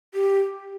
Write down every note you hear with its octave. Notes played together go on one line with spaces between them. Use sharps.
G4